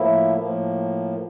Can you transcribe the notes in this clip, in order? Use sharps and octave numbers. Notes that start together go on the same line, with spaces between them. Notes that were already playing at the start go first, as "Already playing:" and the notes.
Already playing: A2 F3 A#3 E4
A2 F3 A#3